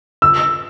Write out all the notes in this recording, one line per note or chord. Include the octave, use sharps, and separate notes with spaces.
E6